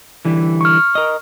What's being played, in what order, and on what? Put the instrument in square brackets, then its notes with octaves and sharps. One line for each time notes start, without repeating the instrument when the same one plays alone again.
[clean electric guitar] D3 E3 G3
[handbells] C#6 F6
[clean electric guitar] A#4 D#5